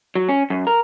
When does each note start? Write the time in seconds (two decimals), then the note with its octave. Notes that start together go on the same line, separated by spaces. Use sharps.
0.15 F#3
0.29 C#4
0.50 F#2
0.67 A#4